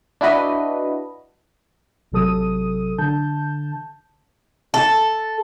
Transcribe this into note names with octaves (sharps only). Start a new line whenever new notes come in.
D4 E4 F#4 B4 D#5
A1 C3 F#3 A4 D#6 D#7
D3 A5 G6
A4